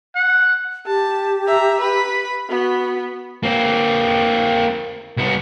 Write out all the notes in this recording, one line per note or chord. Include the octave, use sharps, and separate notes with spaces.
F#5
G4 A5
E5 A#5
B4 B5
B3 F#4
A#3 C4
C2 B3